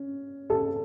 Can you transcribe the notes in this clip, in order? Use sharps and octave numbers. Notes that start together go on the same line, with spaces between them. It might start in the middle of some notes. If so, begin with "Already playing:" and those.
Already playing: C#4
A4 A5